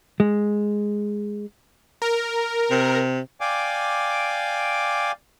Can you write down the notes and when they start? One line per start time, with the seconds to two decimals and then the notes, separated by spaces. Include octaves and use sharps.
0.20 G#3
2.02 A#4
2.71 C3
3.41 D5 F5 G5 G#5 D6